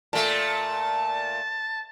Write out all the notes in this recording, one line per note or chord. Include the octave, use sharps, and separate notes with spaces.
A#2 A3 A5